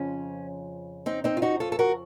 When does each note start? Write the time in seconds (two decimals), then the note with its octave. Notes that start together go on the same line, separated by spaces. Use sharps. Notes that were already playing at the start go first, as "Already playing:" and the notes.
Already playing: F2 C#3 F3 C#4
1.06 C4 D#4
1.24 C4 D#4
1.37 F4
1.42 D#4 F#4
1.60 F4 A4
1.72 A4
1.79 F#4 A#4